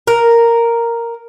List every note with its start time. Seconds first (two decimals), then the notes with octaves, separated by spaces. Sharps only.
0.07 A#4